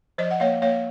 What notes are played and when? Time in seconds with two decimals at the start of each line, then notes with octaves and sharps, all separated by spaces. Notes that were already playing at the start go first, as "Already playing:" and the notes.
0.18 F3 C5 D#5
0.31 F#5
0.40 A#3 C#5 F5
0.62 A#3 C#5 F5